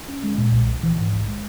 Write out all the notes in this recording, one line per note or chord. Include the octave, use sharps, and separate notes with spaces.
C#4
G#3
A#2
B1
A#1
E3
G#2
A#1
G#3